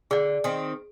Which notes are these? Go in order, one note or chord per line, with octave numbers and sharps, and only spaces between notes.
D3 G#4 D5
D#3 C4